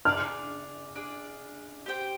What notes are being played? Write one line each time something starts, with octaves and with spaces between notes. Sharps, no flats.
D4 G#4 D5 F6
D4 G#4 D5
G4 C5 G5